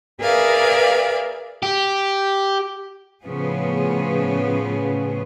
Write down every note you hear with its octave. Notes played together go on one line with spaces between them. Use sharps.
G#4 A#4 B4 D5 E5 F5
G4
A2 C#3 F3 B3 G#4